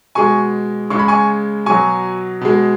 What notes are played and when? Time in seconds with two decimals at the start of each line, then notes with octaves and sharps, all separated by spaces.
0.15 B2 G#3 G#5 C#6
0.90 C#3 G#3 C#6
0.99 B5
1.08 G#5 C#6
1.66 B2 F#3 G#5 C#6
2.41 B2 G#3